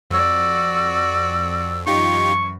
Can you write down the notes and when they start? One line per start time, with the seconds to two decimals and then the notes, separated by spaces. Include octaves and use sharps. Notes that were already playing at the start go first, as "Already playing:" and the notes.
0.11 F2 F#4 D5 E6
1.87 F#2 E3 D#4 F4 G4 C#6